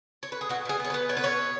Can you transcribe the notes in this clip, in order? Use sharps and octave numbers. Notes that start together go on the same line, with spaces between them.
C#5
B4
G#4
B2 F#4
B2 G#4
B3 C#5
B4
B3
B2 C#5
B4
B2 C#5
B3